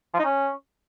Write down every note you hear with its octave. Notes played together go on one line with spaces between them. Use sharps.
F3
D#4
C#4